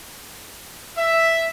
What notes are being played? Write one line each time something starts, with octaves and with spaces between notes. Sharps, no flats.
E5